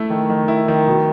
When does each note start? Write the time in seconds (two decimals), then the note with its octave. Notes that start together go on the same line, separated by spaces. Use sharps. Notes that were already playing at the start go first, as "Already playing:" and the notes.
Already playing: A3 E4
0.10 D#3
0.30 D#3
0.48 E4
0.68 D#3
0.87 B2